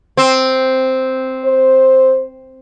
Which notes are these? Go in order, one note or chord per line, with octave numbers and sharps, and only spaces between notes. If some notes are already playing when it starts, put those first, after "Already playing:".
C4
C5